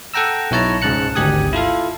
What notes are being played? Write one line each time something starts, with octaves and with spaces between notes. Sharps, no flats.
A4 F#5 G5 A#5 E6
B1 E4 C#5 A5 A#5
C#2 G#2 C#3 A5 F#6 C#7
G#1 D2 G4 G#5 D#6
E4 F4 A4 F5